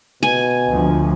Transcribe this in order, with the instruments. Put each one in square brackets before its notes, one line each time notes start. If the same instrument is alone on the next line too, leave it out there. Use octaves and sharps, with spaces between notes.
[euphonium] B2 [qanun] G#5
[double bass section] D2 F3